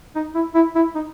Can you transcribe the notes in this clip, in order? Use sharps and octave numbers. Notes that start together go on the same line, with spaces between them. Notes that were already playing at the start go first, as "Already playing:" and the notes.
D#4
E4
E4
E4
D#4